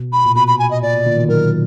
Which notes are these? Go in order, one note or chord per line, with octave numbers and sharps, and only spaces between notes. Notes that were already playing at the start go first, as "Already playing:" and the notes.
Already playing: B2
B5
A#2
B2 B5
B5
G#5
D#5
A#2 D5
B2
A#2 D3
B2 D#3
D#3 F#3 A#4